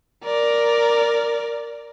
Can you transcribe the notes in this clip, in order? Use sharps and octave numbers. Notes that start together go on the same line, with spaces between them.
A#4 D5